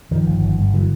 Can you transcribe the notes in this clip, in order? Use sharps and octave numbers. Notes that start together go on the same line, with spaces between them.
G2 D#3 F3
G1
G1
G2
D3 E3 F#3